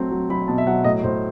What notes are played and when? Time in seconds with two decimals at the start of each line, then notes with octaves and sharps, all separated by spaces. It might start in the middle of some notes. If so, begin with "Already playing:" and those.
Already playing: F#3 A3 C4
0.11 F#3
0.30 F#3 B5
0.48 B2 A5
0.58 E5
0.67 F#3 F#5
0.84 A2 D#5
1.04 A2 C5